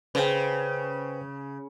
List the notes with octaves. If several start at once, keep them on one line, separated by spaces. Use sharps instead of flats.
C#3 B4 C5 G5